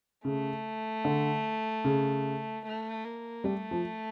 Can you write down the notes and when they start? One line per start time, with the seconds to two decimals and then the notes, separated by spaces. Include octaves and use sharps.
0.25 C#3 A3
1.05 D3
1.84 C#3
2.65 A3
3.04 A#3
3.44 G3 A3
3.71 F3